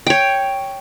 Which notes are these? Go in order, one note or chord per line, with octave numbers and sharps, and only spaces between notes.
C#5 G5